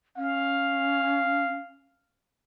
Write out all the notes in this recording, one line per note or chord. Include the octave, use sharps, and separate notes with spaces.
C#4 F5